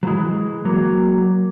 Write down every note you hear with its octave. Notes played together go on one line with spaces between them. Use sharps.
F#3
E3 G#3
F#3 A#3